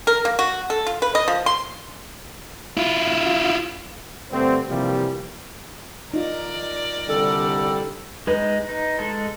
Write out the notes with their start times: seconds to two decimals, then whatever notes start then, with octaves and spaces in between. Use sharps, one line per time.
0.07 A#4
0.25 A#3
0.39 F#4
0.70 A4
0.87 F4
1.02 B4
1.15 D#5
1.28 F3
1.46 C6
2.77 E4 F4
4.32 G2 D3 A3 C4
4.70 C3 E3 F3 G3 A#3
6.14 D#4 F4 A#4 D5
7.09 C2 D3 G3 A4
8.27 G#3 D#4 B4
8.69 D#4
8.99 G#3 A4